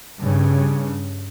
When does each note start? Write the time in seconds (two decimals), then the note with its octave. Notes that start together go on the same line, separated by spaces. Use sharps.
0.19 G2 C#3